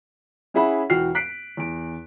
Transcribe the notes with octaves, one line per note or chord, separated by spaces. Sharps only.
C#4 E4 G#4 E5 F#5 B5
E1 E3 F#4 G5 F6 C7
F#6 B6 C7 D7
E2 D7